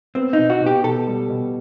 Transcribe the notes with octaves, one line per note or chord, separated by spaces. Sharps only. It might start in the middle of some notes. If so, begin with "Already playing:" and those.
B3 C4
D#4
B2
F#4
B2
G4
B2 A4
G3
B2